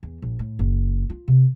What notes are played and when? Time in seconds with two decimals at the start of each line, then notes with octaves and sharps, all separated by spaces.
0.03 E2
0.22 A#1
0.39 A2
0.59 F#1
1.10 F4
1.28 C3